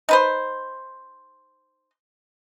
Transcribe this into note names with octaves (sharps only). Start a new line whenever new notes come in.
D#4 B4 C5